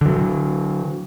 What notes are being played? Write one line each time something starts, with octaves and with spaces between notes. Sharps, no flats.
D3 F#3